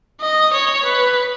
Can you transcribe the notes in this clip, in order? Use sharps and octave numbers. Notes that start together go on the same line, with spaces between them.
D#5
C#5
B4